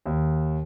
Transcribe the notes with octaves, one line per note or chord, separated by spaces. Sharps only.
D#2